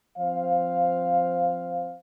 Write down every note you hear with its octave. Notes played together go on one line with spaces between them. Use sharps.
F3 C4 C5 F5